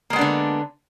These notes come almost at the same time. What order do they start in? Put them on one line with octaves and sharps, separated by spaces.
A#3 G#3 B3 D4 D3